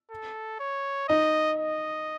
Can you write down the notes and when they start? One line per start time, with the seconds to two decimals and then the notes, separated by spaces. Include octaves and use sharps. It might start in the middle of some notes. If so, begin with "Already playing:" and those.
0.11 A4
0.60 C#5
1.08 D#4 D#5
1.58 D#5